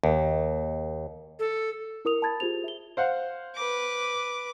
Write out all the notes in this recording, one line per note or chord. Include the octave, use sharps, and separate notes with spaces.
D#2
A4
E4 A#4 D#6 F7
A5 B5 G#6 A6
F4 G4 G#4 C5 F7
E5 G7
C5 F5 F#5
B4 D6